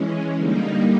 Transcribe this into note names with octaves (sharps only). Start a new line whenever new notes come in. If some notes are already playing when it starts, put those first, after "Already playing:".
Already playing: E3 G#3 C#4
D3 G3 A#3 D#4